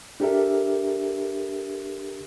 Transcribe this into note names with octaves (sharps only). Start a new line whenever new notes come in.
D4 G4 A4 A#4 E5